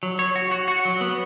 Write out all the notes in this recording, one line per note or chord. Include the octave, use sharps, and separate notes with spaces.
F#3
C#5
F#4
F#4
F#4
F#3
B3